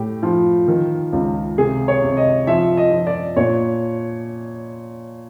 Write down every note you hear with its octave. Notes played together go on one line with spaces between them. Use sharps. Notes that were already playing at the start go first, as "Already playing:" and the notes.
Already playing: A2 G4
F3
D#3
C#2
C3 G#4
C#5
C3
D#5
F3 E5
D#5
F3
D5
A#2 C#5